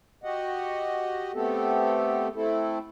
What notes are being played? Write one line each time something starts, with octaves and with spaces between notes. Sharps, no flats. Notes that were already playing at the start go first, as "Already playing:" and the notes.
F#4 G4 D#5 F#5
A3 B3 C4 G4 A4
A3 C4 E4 A4